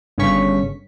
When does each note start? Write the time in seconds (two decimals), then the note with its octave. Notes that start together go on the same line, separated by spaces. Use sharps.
0.18 G1 G2 C#3 C#4 C#6 B6